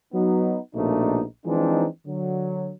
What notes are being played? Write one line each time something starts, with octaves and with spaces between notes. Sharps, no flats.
F#3 B3 D#4
A#1 B2 A3 A#3 D4 D#4
E3 F3 G#3 C4 D4 D#4
D3 F#3